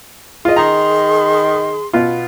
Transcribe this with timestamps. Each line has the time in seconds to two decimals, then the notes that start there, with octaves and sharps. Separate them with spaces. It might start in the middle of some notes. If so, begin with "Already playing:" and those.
0.45 F4 G#4 D#5
0.56 D#3 A#5 C6
1.93 B2 B3 F4